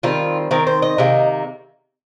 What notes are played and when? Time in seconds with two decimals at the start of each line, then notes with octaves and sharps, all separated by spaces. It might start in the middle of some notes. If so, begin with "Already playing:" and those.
0.03 D#3 G3 C4 F4
0.51 D#3 C4 A#4
0.67 C5
0.82 D#5
0.98 C3 D#3 A#3